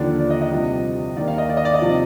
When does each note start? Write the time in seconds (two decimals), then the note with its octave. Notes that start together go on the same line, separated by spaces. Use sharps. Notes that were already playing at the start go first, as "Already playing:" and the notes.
Already playing: D#2 D3 F3 D5
0.19 D5
0.30 D#5
0.41 D#5
0.51 C2 C3 F3
1.16 D#2 D5
1.20 D#3
1.28 F5
1.38 D#5
1.49 D5
1.57 D#5
1.65 D5
1.74 D#5
1.82 C3 F3